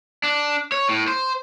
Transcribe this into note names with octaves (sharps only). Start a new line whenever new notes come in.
D4
C#5
A2
C5